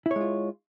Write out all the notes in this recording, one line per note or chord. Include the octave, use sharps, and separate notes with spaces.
G#3 E4 F4 C#5